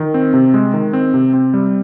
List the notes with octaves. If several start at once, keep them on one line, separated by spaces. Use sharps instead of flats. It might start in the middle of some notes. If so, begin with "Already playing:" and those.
Already playing: D#3
C4
C3
G#3
D#3
C4
C3
C4
G3